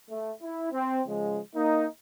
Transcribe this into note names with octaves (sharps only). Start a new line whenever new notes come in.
A3
E4
C4
C#3 F3 G#3
A#3 D#4